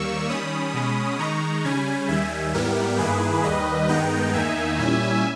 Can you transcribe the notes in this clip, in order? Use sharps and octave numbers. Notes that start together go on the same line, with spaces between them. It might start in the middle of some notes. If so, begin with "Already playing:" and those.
Already playing: D#2 D#3 G3 A#3 C#6 E6
D#3 G3 C#4 B5 D#6
B2 G#3 C#4
D#3 G#3 D#4 A#5 C#6
C#3 G3 C#4 G#5 B5
D#2 D#3 G3 E5 G#5
G#2 G3 B3 E4 G4 A#4
G2 D#3 A#3 E4 G#4 B4
D#2 D#3 G3 B4 D#5
G2 D#3 G#3 B3 D#4 G5 A#5
E2 D#3 A#3 D#4 E5 G#5
A#2 G3 C#4 E4